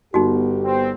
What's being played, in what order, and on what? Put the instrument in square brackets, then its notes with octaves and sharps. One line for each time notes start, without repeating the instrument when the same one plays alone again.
[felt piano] G1 [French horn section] B3 G4 [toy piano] D#4 F#4
[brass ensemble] C4